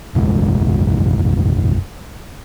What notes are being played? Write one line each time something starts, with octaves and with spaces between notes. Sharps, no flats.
F#1 B1 E2 G#3